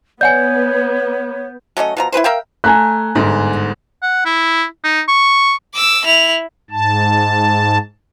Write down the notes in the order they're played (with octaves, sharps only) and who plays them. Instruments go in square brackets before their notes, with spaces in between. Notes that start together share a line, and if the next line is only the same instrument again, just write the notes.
[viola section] B3 [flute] C#5 [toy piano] D5 F#5 G#5 [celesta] G6
[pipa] F#3 A3 C#4 D#5
B2 F3 A#5
E4 G4 B4 C5
A#4 E5 F5 G5
[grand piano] A3 [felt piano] G#5 A#5 F#6
[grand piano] G1 G#2
[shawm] F#5
E4
D#4
C#6
[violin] D6 E6
E4 F7
[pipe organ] G#2 A5